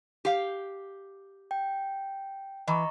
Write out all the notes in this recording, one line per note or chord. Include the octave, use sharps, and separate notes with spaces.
G4 F5
G5
E3 D#5 A#5 C#6